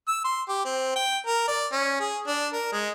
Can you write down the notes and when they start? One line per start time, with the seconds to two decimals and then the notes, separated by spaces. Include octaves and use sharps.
0.08 E6
0.24 C6
0.48 G4
0.65 C4
0.96 G5
1.27 A#4
1.48 D5
1.73 C#4
2.00 G#4
2.27 D4
2.54 A#4
2.72 G#3